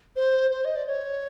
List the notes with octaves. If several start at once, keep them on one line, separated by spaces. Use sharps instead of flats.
C5
C5
D#5
D5
C#5